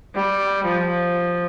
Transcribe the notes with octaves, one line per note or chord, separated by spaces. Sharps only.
G3
F3